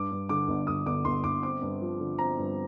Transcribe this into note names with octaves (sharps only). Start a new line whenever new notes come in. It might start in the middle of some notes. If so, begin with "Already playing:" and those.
Already playing: G2 D6
G2
D3 D6
G1
G1 D#6
G1 D6
G1 C6
G1 D6
C4 D6
G2
F3
D3
C4 A#5
G2